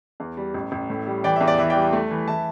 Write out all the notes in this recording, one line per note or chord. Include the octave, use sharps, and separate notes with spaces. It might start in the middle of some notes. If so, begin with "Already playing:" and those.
E2
G3
A1
A1
A2
G3
E3 D5 G5
E5
E2
D5
E3 E5
D5 G5
G3
A3
E3
E3 E5 A5